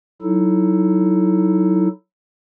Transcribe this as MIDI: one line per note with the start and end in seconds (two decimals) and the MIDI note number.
0.22 1.88 54
0.22 1.88 63
0.22 1.88 64
0.22 1.88 69